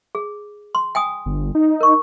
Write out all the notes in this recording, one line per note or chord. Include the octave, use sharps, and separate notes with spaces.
G#4
C6
G5 G#5 D#6
G1
D#4
A#4 C#6